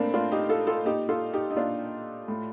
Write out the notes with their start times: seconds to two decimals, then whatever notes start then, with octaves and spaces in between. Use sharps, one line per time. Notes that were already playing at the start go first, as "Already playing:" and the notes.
Already playing: A2 A3 A#3 C4 D4
0.14 A2 D4 F4
0.32 D#4 G4
0.49 F4 A4
0.67 F4 A4
0.85 A#2 D#4 G4
1.09 F4 A4
1.33 D#4 G4
1.51 D#4
1.57 A#2 D4 F4
2.28 A2